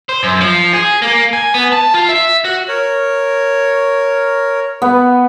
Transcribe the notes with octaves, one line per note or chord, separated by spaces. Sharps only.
C5
F#2
F3
G#4
A#3
G#5
B3
A5
F4
E5
F#4
A#4 C#5
B3